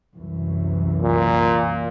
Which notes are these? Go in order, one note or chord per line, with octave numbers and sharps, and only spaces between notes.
C2 F#2 E3
A#2